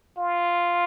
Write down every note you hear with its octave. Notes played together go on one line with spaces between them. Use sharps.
F4